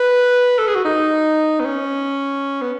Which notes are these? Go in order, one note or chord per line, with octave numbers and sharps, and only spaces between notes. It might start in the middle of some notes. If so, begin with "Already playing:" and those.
Already playing: B4
A4
G#4
F#4
D#4
B3
C#4
B3